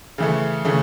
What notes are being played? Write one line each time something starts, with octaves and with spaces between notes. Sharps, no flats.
C#3 E3 A3
C#3 E3 A3